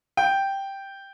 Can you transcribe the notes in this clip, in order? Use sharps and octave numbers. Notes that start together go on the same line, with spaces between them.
G5